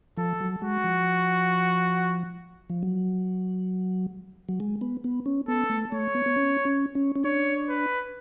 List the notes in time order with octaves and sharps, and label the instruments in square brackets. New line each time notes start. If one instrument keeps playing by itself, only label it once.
[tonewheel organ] F3 [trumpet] A4
[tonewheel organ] F#3
[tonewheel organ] G#3 [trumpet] F#4
[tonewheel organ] F3
F3
F#3
F#3
G#3
B3
B3
C#4
[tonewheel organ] B3 [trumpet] A4
[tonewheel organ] A3
[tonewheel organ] A3 [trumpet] C#5
[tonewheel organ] B3
B3
C#4
C#4
C#4
C#4
[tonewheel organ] D4 [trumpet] C#5
[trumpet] B4